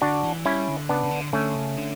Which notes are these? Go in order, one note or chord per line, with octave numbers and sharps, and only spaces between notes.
D3 D4 F#4
E3
G3 C#4 E4
D3
C#3 B3 D4
C#3
D3
D3 A3 C#4
C#3
D3